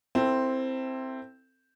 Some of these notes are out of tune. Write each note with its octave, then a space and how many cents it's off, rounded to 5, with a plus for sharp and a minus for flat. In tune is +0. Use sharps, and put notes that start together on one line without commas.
C4 +0 E4 +0 A4 +35